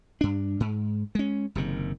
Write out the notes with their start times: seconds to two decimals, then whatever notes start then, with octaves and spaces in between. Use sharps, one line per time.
0.21 G2 D4
0.60 G#2
1.15 G#3 C#4
1.55 F#1 C3 D#3